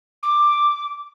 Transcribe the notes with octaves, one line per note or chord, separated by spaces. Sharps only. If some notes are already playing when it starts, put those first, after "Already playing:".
D6